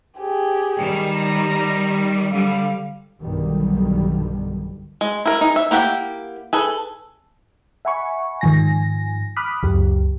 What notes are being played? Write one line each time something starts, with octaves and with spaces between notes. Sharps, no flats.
G4 G#4
D#3 G3
A#5
D3 G3 F5
B1 G2 D3 D#3 G3
G#3
E4 A#4
D#4 G#4
E5
A#3 E4 G4 F#5
G#4 A4 B4
E5 F#5 G#5 B5 C#6
G#2 D#3 F3 G#5 A#6
B5 D6 D#6 F6 F#6 B6
C#2 F#2 G4